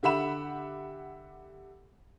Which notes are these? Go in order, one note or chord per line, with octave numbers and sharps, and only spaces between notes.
D3 G4 E5 F#5 B5 E7